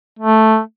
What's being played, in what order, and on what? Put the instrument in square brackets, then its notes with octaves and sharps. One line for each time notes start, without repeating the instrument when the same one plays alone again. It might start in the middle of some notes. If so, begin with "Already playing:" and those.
[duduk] A3